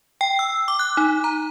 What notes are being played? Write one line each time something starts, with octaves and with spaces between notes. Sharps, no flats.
G5
E6
D6
F#6
D#4
A#5